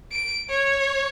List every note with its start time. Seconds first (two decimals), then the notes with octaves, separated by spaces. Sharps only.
0.12 D7
0.49 C#5